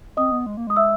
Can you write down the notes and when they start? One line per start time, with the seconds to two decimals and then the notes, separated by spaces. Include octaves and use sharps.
0.17 C4 D#5 D#6
0.32 B3
0.46 G#3
0.57 A#3
0.67 G#3 D#6
0.76 E5 E6